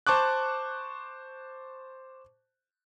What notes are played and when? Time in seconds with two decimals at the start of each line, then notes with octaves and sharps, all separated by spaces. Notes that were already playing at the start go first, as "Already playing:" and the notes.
0.07 C5 A5 C#6 D6 F#6